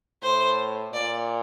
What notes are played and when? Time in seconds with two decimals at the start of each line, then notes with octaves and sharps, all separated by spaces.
0.22 A2 C5
0.93 A#2 D5